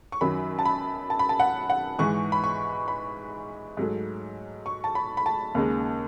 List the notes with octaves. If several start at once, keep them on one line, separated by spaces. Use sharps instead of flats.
C#6
F#2 D#3 F#3 B5
A5
B5
A5
B5
A5
F#5
F#5
G#2 E3 G#3 C#6
B5
C#6
B5
G#2 F#3 A3
C#6
A5
B5
B5
A5
D#2 C#3 G#3